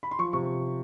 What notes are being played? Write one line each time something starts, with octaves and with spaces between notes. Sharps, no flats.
B5
C6
F3 C#6
C3 C#6